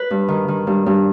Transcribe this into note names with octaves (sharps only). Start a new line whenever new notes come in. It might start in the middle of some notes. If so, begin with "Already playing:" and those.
Already playing: B4
G2
D#3
D#3
G2
G2